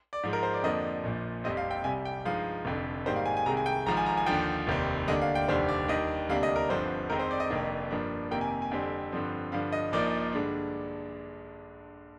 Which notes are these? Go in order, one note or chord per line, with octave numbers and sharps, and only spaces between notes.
D5
G#2 F3 G#3
A#4
C5
D5
F2 D3 F3 A#3 D4 D#5
A#1 A#2 F3
F1 F2 C3 G3 C4 D#5
F5
G5
C2 C3 G3 G#5
G5
G2 F3 G#3 D#4 F5
F1 F2 D3
G#2 D#3 G3 A#3 C5
F5
G#5
G#5
C2 C3 D#3 G#3 A#5
G#5
G5
G#1 G#2 F3 A#5
G#5
A#5
G#5
D#2 D3 F3 G5
F1 D#2 D#3 G3 C4
D2 D3 G3 A#3 D4 D#5
F5
G5
F1 D#2 D3 G3 C5
D5
D#2 D#3 G3 D4 D#5
D2 C3 G3 A#3 D4 F5
D#5
A#4
G1 G2 D3 F3 C4 C5
F2 D#3 G#3 C4 D#4 A#4
C5
D5
D#5
F1 F2 D#3 A#3 D4
G2 F3 A#3 D4
F2 C3 D#3 A#3 G5
G#5
G#5
F2 D3 G3 C4
G2 D3 F3 C4
G2 D3 F3 F5
D#5
A#1 A#2 F3 A#3 D#4 D5
G2 D3 G#3 D4